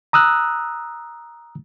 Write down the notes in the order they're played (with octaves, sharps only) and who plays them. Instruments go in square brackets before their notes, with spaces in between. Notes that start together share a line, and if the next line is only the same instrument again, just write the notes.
[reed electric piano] A#5 D#6 E6 F#6